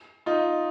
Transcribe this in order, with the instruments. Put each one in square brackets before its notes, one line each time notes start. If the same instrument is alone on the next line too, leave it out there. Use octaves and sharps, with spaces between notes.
[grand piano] D#4 F4